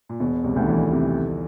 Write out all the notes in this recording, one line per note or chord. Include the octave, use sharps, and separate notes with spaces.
A#2
E1 B2
C2 C3
D3
D2 D#3
E2 E3
C3